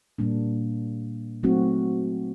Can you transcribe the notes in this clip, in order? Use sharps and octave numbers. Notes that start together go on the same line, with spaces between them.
A#2 G3 A#3 D4
F#3 A3 C4 D#4 F#4